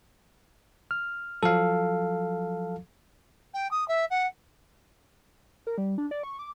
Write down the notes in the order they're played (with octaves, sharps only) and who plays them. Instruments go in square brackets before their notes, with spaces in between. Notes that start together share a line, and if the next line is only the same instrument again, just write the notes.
[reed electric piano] F6
[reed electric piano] F3 F#3 [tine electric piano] A4 F5
[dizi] G5
D#6
E5
F#5
[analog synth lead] A#4
G3
D4
D5
C#6
D6